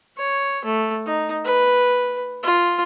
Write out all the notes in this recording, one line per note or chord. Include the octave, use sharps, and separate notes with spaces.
C#5
A3
D#4
B4
F4